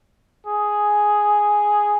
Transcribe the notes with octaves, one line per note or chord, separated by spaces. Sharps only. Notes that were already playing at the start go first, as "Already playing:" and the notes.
G#4